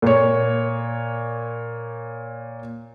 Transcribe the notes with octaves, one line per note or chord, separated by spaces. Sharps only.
A#2 C#5